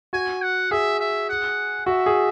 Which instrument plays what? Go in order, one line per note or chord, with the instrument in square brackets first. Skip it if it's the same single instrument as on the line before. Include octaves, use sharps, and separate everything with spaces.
[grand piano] F#4 [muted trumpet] G#5
[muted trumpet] F#5
[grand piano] G#4 [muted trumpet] E5
[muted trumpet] E5
F#5
[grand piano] F#4 [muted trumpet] E5
[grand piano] G#4